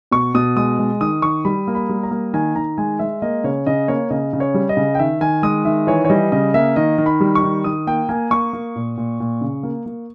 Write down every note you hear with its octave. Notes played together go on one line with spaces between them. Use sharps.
B2 C#6
B2 D#6
G#3 D#6
G#3
D#3 D#6
D#3 C#6
G3 B5
A#3
B5
G3
A#5
A#3
D#3 G#5
D#3 A#5
G#3 G#5
G#3 E5
A#3 D#5
C#3 C#5
C#3 D#5
A#3 C#5
C#3 D#5
C#3
C#5
G3
D#5
C#3
G5
D#3 E5
D#3 G#5
G#3 D#6
D#3 E5
E3 C#5
C#5
G3 D#5
C#3 D#5
A#3 E5
D#3 D#5
D#3
B5
G3
C#6
D#3
D#3 D#6
A#3 G5
A#3 G#5
A#3 C#6
A#3
A#2
A#2
A#2
C#3
A#3
A#3